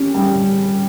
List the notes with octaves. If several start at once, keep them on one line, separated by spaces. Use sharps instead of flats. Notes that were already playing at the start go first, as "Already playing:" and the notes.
Already playing: C#4 G4
G3